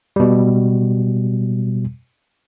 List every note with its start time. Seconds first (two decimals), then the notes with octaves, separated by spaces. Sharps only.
0.16 B2 G3